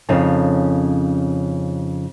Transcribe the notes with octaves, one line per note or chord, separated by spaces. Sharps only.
F2 C#3 C#4 D#4 A4 C#5